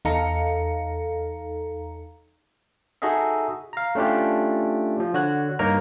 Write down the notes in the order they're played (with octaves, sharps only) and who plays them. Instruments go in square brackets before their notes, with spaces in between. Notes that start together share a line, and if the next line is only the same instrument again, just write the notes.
[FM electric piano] E2 D#4 A4 F5 A#5 C#7
[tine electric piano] D#4 F#4 G#4 A4 D#5 E5
F5 A#5
A3 C#4 D4 F4 G4
F3
D3 F#4 C#5 F#6
G2 A#3 D#4 A#4 C#5 A#5